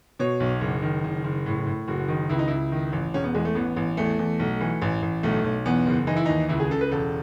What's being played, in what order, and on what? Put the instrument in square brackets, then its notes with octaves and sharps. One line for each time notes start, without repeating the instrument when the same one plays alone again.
[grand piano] B2 C#5
B1
F#1
D#3
F#1
F#1
A2
A2
F#1 F#4
D#3
C#2 E4
D#4
C#2 E4
D#3
A1
E1 C#4
B3
E2 G#3
A3
A1 B3
A1
E2 A3
E2
B1
E3
A1
A1
B1 A3
B1
E2 B3
F#1
E3 D#4
E4
D#2 D#4
C#2 E4
G#4
C#3 A4
B4
E1 A4